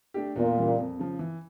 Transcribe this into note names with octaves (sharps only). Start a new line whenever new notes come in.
A3 D4 G4
E2 A#2
C#3 E3 G3
F2
C#3 F3
E3